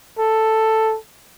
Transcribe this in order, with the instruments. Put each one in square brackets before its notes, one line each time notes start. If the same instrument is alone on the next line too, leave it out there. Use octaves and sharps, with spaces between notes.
[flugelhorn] A4